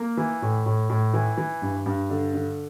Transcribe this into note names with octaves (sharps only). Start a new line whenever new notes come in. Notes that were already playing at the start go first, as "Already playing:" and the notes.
Already playing: A#3
E3
A2
A2
A2
E3
E3
G2
G2
D3
D3